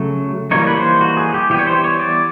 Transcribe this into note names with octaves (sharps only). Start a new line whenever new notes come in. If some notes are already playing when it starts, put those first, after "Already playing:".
Already playing: C#3 F#3 A3
E3 G3 A#3 D#4 C#5
B4
C5
F#4
G#4
G4
E3 G3 B3 G4
C#5
C5
C#5
D5